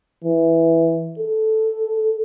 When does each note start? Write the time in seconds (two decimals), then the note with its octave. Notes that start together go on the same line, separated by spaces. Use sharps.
0.25 E3
1.19 A4